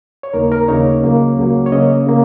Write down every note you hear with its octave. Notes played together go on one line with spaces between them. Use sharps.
C#5
D#2 C#3 A#3 D#4 A#4
A#4
D#2 C#3 A#3 D#4 C#5
C#2 C#3 F#3 A#3
C#2 C#3 F#3 A#3
C#5
C#3 A#3 C#4 D#5
C#3 A#3